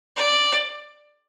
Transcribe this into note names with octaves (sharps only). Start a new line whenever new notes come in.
D5